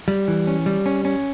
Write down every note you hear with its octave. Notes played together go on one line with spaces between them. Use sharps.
G3
E3
C#4
G3
C#4
C#4